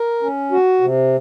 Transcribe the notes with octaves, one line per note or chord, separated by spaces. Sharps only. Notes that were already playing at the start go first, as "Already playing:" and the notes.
Already playing: A#4
C#4
F#4
C3